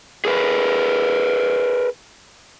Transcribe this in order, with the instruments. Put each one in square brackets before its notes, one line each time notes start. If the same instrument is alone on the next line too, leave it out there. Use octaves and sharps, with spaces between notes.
[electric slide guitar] G#4 A#4 B4